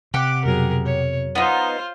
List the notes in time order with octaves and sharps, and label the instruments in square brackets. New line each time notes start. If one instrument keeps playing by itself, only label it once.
[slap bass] C3 [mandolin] G4 F#5 [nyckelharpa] D6
[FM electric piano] F2 B2 F#3 [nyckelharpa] G#4 A#4
[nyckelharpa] C#5
[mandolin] B3 D#4 [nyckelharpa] F4 C5